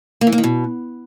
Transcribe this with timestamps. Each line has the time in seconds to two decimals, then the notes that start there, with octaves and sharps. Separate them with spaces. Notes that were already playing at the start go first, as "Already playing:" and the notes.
0.21 A#3
0.27 E3
0.32 A#3
0.38 D#3
0.44 B2